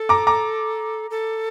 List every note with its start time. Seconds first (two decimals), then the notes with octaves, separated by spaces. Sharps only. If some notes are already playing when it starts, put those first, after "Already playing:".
Already playing: A4
0.09 A#5 D6
0.27 A#5 D6
1.11 A4